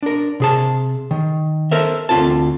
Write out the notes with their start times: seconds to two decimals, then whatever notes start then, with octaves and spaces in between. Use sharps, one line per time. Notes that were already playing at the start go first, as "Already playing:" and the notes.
0.03 D4 A#4
0.40 C3 G#4 A5
1.11 D#3
1.71 A4 A#4 C5 E5
2.09 D2 C4 F4 A4 A5